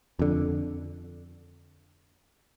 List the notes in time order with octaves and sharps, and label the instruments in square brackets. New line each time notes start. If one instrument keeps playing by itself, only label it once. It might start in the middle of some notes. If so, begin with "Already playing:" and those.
[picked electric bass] F2 D3